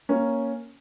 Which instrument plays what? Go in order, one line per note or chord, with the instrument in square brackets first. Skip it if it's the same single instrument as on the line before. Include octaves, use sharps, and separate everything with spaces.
[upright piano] A#3 C#4